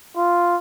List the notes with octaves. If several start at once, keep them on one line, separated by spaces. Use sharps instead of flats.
F4